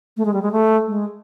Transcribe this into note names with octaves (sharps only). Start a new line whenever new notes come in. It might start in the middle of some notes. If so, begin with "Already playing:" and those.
A3
G#3
G3
G#3
A3
G#3